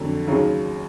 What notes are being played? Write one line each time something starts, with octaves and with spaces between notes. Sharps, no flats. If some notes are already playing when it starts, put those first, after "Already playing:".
Already playing: F2 D3 F#3 A3
D#2 C#3 F#3